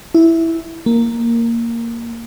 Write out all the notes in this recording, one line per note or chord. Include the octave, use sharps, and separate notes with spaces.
E4
A#3